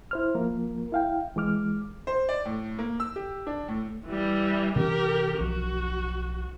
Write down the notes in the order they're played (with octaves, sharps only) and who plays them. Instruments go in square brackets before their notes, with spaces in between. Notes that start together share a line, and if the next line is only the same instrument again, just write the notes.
[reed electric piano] E4 C5 F6
F3 A#3 A#4
E4 F5 G5
E3 G#3 D6 F6
[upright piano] C5
D5
A2
A#3
E6
G4
D4
A2
[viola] E3 G3
[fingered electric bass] C3 E3 C#4 [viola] G4 A#4
[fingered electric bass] B1 F3 [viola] F#4